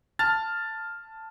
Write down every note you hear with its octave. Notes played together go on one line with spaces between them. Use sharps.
A5 F6 A6